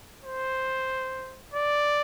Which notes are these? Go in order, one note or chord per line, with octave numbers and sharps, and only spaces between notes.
C5
D5